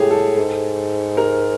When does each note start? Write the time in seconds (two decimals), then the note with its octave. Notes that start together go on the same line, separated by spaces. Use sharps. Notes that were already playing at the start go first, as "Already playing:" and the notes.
Already playing: A2 G4 G#4
0.11 A4
0.38 G#2
1.17 A#4